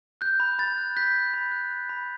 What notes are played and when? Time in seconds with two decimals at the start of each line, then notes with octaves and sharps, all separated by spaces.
0.21 F#6 G6
0.40 B5
0.59 B5 A6
0.78 F#6
0.95 F#6 G6 B6
1.14 B5
1.34 B5
1.52 F#6
1.70 F#6
1.89 B5